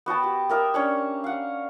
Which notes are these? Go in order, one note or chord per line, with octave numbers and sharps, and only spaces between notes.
B3 F#4 G5 A5
G4
A#3 A#4 E5 D#6
C#4 D4 C#5
F5 F#5